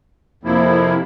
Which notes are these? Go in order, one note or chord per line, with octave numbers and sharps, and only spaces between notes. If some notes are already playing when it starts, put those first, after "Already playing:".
F2 C3 F3 A#3 E4